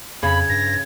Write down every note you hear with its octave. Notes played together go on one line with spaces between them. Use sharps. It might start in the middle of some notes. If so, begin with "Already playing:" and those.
F2 C#3 B5 G#6
G2 A#6